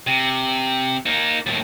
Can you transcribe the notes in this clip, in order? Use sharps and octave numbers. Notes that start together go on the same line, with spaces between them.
C3
A#3 D#4
D#2 A2